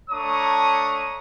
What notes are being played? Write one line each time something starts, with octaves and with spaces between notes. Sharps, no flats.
A3 D4 C#5 A#5 C#6 D#6